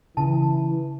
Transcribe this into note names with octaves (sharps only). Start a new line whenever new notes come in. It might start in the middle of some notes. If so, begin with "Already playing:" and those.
C#3 E3 A5